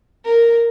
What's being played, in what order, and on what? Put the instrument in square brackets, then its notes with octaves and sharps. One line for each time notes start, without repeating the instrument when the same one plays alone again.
[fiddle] A#4